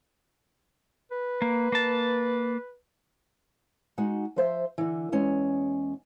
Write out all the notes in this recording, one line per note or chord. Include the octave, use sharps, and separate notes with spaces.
B4
A#3
A#3 A5
G#3 D#4 F#4
F3 C5 E5
D3 E3
E2 G#3 C#4